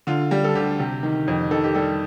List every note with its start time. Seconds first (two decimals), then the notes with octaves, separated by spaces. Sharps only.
0.07 D3 F4
0.31 G3
0.44 A4
0.55 D2 G4
0.80 C3
1.03 D#3
1.28 F2
1.51 D#3 A4
1.64 G4
1.74 G3 A4